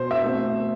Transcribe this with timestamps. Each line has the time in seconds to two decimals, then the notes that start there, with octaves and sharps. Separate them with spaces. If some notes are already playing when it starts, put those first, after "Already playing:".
Already playing: B2 C5
0.11 E5
0.24 A3 C4